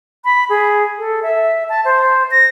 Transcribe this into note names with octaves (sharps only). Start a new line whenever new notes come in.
B5
G#4
A4
E5
A5
C5
A#6